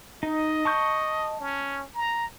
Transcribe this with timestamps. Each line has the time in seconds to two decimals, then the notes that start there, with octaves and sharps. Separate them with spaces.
0.23 D#4 D#5
0.65 A5 C#6 G6
1.40 C#4
1.95 A#5